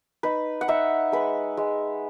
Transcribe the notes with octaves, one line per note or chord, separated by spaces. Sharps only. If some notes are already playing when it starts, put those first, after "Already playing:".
D#4 B4
F#5
D#4 E5
G#3 B4
G#3